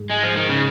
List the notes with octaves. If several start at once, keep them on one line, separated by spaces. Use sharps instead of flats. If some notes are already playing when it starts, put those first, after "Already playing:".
Already playing: G#2
G#3
F3
D#3
C#3